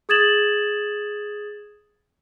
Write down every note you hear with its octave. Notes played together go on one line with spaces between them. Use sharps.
G#4 D#6 G#6 A6 E7 F#7